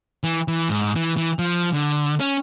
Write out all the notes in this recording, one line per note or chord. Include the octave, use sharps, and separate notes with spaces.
E3
E3
G#2
E3
E3
F3
D3
C#4